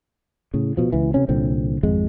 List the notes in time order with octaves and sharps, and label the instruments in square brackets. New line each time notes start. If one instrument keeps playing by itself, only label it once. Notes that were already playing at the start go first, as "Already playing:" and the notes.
[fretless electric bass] A2 C#3
B2 F3
C#2 E3
C3 C#4
C2 A#2 D3 C4
G#1 F2 G#3